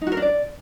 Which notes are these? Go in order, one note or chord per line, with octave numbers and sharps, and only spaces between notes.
D#4
F#4
A#4
D4
D5